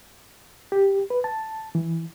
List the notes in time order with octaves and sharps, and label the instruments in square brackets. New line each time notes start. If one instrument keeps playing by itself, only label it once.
[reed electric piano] G4
B4
A5
E3